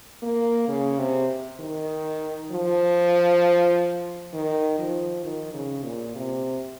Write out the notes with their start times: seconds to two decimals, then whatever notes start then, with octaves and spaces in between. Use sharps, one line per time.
0.23 A#3
0.68 C#3
0.99 C3
1.60 D#3
2.52 F3
4.34 D#3
4.79 F3
5.24 D#3
5.54 C#3
5.84 A#2
6.16 C3